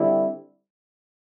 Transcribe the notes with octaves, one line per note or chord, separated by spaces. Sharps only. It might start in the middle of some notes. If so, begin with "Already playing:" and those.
Already playing: D3 G3 C4 E4